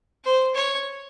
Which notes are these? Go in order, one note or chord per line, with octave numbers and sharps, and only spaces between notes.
C5
C#5